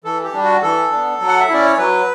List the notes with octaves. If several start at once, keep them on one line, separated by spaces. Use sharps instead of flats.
E3 A4
G4
G3 D4
F#4
E3 A4
B3 D4
F#3
F#5
E5
C#4 E4 D5
C#5
F#3 B4